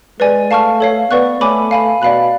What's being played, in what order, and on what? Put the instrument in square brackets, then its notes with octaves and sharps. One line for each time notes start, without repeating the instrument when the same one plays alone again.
[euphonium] G#3 [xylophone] B4 D5 G#5
[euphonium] A3 [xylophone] F5 A5 C#6 F6
[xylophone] A4 C#5 F5
[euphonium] B3 [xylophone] B4 D5 F#5 C#6 F#6
[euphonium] A3 [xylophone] A4 C#5 G#5 B5 D6
[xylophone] F5 G#5 B5
[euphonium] B2 [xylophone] D5 F5 B5 F#6